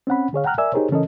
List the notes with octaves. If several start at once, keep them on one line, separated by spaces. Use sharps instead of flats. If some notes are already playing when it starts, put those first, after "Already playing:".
C4 C#4 F#5 B5
D3 G#4 C#5 F5
F#5 G5 A#5 F6 F#6
A#4 D5 E5 G#5 E6
D#4 G4 G#4 A#4 C5 C#5
C#3 E3 C#4 A4 A#4 D#5